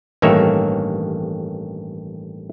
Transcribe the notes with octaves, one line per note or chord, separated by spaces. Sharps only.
A1 G2 D#3 A#3 C#5 E5